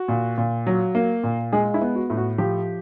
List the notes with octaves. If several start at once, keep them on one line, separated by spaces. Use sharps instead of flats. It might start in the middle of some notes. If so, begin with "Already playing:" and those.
Already playing: F#4
A#2
A#2
F#3
A#3
A#2
G#3 G#4
E4
B3
F#4
A2
F#4
F3 G4